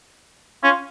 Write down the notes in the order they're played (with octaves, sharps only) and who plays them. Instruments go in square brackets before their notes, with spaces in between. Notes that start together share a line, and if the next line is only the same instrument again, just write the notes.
[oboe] C#4 [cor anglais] F4